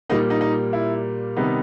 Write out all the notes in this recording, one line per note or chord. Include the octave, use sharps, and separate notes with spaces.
A#2 G3 A#3 D#4
D#4
D#4
E4
C3 D#3 G3 B3 D#4